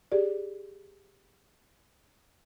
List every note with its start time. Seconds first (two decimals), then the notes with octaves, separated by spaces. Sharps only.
0.12 G4 G#4 D5